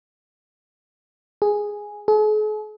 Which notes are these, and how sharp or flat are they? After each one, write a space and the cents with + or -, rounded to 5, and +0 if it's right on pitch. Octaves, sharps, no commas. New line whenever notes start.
G#4 -5
G#4 +45